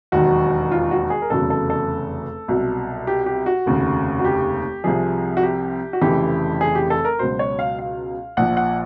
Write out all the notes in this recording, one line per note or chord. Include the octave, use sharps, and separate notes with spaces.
E1 D#2 D#3 F#3 F#4
F4
F#4
G#4
A#4
F1 E2 C#3 F#3 A4
A4
A4
C2 B2 F#3
G4
G4
F#4
F1 D#2 C#3
F#4
G4
C2 C3 F3 G#4
F#4
G4
F#4
F1 F2 C#3 E3 G4
G#4
G4
A4
A#4
C#2 B2 F#3 C5
C#5
F5
F5
A#1 A#2 F3 F#5
F#5